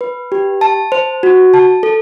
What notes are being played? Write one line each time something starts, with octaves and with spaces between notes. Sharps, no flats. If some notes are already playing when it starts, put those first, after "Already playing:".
B4
G4
A5
C5
F#4
A5
A4